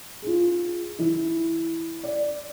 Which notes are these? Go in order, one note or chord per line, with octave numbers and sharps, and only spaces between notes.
F4 G#4
E3 E4
D5